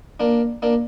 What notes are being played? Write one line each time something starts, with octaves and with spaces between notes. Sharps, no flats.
A#3 D4
A#3 D4